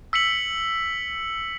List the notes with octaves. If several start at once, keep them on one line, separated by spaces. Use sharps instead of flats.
E6 B6 C#7 F#7